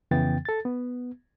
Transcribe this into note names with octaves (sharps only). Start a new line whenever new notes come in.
F2 C#3 E3 B3 G5 A6
A4 A6
B3